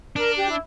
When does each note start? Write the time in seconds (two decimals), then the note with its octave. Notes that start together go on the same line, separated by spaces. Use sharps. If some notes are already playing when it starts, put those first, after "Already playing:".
0.16 D4 A#4
0.37 G4
0.49 E4